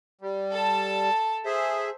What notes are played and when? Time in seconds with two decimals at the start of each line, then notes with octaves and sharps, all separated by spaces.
0.21 G3
0.51 A4 A5
1.45 G#4 C5 E5